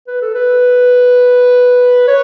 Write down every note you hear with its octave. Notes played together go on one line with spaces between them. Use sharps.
B4
A4
B4
C#5